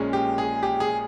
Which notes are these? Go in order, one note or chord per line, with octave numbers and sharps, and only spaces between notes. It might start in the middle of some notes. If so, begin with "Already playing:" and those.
Already playing: A#1 A#2 G#3 C#4
G4
G#4
G4
G#4